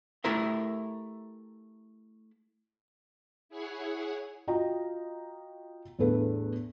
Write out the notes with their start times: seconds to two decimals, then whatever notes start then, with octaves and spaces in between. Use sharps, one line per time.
0.24 A3 E4 G4 A#4 E5
3.49 E4 G#4 C#5 F#5 G#5
4.47 F4 F#4 D#5 G5 A#5
5.99 E2 A2 D4 G#4 A4 B4